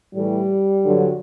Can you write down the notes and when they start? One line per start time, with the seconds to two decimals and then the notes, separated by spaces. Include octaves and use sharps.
0.14 A2 E3 G3
0.84 G2 D3 F#3